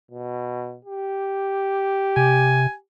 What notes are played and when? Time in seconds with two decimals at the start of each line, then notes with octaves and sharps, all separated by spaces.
0.11 B2
0.85 G4
2.17 C3 G#5